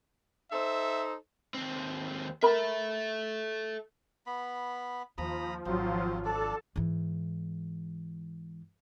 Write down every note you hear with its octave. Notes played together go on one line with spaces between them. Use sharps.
D#4 A4 C5 E5
D#2 C4
A4 A#4 E5 B5
B3 B5
D#2 F3 A#5 B5 D#6
G#1 F3 F#3 C4 F4
D4 A4 D5 A5
G#2 E3